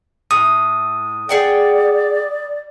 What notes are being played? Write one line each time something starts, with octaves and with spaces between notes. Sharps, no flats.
A2 D#6
G#4 D5 F#5 G5